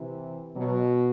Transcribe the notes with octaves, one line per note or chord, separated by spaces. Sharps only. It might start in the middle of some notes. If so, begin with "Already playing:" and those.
Already playing: C3 E3
B2 F#3